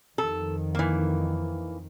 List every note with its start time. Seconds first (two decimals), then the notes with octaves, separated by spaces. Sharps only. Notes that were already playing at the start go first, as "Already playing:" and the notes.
0.18 F2 D#3 A4
0.75 E3 A#3